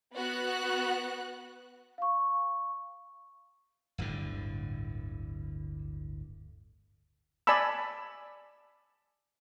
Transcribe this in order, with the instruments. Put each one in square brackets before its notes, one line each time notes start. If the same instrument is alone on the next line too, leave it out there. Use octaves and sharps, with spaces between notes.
[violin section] B3 F#4 F#6
[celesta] F5 C#6
[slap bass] D1 G1 A2 D3
[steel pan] D5 G#5 A5 B5 E6